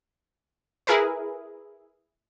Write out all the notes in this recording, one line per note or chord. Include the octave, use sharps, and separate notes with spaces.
E4 G#4 A#4 B4